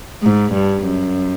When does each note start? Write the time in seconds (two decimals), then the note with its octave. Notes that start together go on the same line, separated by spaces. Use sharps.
0.23 G#2
0.53 G2
0.84 F#2